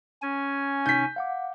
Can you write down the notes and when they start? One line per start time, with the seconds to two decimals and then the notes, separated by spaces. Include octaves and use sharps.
0.22 C#4 G#5
0.86 G#1 C3 D#4 G6 B6
1.16 F5 F#5 D6